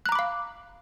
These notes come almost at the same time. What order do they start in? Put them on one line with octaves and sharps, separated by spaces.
F#6 A#5 D6 B5 F5